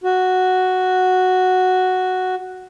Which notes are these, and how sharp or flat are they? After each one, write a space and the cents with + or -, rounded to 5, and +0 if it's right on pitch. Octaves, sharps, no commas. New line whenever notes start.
F#4 +0